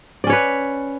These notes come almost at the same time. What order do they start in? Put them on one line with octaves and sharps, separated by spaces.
D5 C#4 C#5 B4